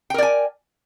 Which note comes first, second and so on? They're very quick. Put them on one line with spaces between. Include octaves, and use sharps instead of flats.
G5 A#4 D5 G#5